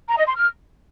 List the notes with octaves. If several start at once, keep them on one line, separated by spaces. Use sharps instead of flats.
A#5
D#5
C6
F6